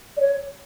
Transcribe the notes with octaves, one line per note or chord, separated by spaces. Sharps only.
D5
C#5